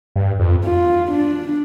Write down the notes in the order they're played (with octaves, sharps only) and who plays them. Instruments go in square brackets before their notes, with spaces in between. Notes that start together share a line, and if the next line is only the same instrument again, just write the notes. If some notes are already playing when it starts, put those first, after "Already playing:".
[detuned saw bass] G2
F2
[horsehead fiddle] F4
D4